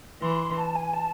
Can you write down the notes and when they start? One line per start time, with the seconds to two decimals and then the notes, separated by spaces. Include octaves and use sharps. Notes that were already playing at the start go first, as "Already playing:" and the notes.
0.22 E3 C6
0.58 A5
0.75 G#5
0.93 A5